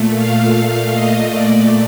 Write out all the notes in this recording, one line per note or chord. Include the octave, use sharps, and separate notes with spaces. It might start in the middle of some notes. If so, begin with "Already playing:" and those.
Already playing: A#2 A3
F5
A#2 A3 D#5
D5